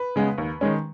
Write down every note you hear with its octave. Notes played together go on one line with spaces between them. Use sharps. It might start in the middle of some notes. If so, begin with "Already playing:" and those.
Already playing: B4
C#3 G#3 B3
D#2
D#3 G#3 C#4